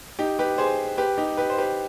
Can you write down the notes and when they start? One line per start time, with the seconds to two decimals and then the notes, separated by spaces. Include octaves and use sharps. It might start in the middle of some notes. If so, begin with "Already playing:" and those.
0.19 D#4 G4
0.39 G4 B4
0.58 G#4 C5
0.97 G4 B4
1.18 D#4 G4
1.37 G4 B4
1.50 C5
1.58 G4 B4